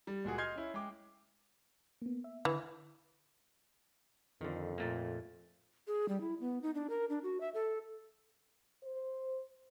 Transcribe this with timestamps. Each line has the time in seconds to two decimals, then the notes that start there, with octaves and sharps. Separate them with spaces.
0.07 G3
0.25 C#2 A#2 F#4 G#4
0.38 D#5 C6 F6 G6 G#6 C7
0.56 C#4 E4
0.74 G#3 G5 D6
2.02 A#3 B3
2.24 E5
2.45 D3 E3
4.41 F2 D3 D#3
4.78 A#2 A3 A#3
5.87 G#4
6.09 G3
6.21 E4
6.41 B3
6.62 D#4
6.75 D4
6.90 A#4
7.09 D4
7.23 F#4
7.41 E5
7.54 A4
8.84 C5